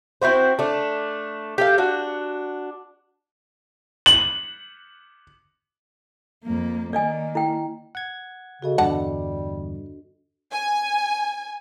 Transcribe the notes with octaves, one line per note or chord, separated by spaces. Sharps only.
C4 E4 F#4 C5
A3 D4
G4 A4 F5
D4 F#4
F#7
F2 A#3
D#3 A#3 D5 D#5 G#5
E4 G5
F#5 G#6
C#3 F#4 A4 D#5
E2 G2 D3 G3 D4 F#5 A5
G#5